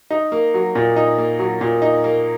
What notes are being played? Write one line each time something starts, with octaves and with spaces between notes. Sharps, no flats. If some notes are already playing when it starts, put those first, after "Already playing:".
D#4
A#3
F#3
A#2
D#4
A#3
F#3
A#2
D#4
A#3